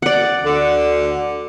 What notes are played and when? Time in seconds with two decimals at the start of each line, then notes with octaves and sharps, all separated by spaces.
0.02 D5 F#5
0.45 D2 D3